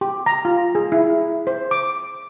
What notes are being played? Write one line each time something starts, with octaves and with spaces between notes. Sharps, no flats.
G4
A#5
F4
G#4
E4
C5
D6